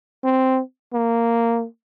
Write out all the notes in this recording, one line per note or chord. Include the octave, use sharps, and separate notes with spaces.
C4
A#3